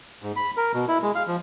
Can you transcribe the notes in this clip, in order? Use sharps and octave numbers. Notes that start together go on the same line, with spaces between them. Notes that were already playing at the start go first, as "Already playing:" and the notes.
G#2
B5
A#4
B2
E4
G#3
F5
F3